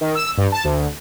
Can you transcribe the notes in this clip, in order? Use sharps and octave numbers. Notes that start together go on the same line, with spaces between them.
D#3
E6
G2
A5
D2